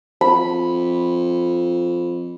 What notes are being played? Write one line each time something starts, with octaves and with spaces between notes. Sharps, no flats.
F2 B5